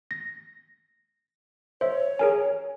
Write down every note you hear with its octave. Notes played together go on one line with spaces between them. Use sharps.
A#6
C5 C#5 E5
G#4 A#4 G#5